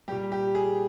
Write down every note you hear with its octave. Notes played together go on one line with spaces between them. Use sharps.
A#2 G3 G4
G4
G#4